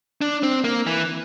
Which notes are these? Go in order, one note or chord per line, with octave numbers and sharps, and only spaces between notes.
D4
C4
A#3
E3